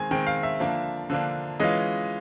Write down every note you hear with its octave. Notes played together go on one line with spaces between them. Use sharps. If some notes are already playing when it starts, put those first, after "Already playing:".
Already playing: D#3 G#3 C4 G#5
D#3 G#3 C4 G5
F5
E5
D3 F3 A#3 D4
D3 F3 A#3 D4
E3 G#3 C#4 F4 D#5